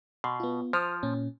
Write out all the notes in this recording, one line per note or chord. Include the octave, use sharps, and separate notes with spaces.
B2 C6
B3 F4
F3 C5 D#6 F6
A#2 C#4